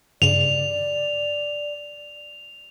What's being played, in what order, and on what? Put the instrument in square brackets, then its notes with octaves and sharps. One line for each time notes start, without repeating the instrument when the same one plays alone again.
[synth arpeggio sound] G2 C#3 [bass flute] D5 [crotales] F7